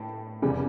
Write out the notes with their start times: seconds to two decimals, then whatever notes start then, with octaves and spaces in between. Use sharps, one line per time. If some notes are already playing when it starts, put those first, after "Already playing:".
Already playing: A2 G5 A5
0.42 F1 E2 C#3 G3